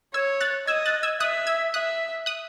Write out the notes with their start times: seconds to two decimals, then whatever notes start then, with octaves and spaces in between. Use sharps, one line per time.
0.14 C#5 E6 G#6
0.41 F#6 A6
0.67 D#5 E6 G#6
0.86 F#6 A6
1.03 E6 G#6
1.20 E5 D#6 F#6
1.47 E6 G#6
1.74 E5 D#6 F#6
2.26 D#6 F#6